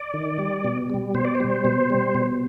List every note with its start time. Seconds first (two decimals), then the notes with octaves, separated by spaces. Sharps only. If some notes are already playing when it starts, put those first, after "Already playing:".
Already playing: D5
0.14 D#3
0.39 G3
0.64 B2
0.90 G3
1.14 B2 C5
1.25 D5
1.35 C5
1.40 G3
1.65 B2
1.90 G3
2.15 B2